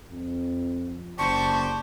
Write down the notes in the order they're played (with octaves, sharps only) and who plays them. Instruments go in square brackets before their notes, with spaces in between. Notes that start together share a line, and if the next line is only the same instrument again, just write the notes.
[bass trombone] F2
[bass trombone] F#1 [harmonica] G4 C5 D5 [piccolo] A5 [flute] C#6